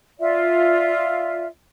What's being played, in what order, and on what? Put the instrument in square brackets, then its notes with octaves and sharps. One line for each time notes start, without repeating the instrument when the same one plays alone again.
[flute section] F4 D5 E5